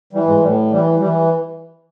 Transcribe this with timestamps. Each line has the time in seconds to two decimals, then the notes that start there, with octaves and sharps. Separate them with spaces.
0.13 E3 G3
0.27 G#2 G#3
0.42 A2 G3
0.71 E3 G3
0.99 E3 G3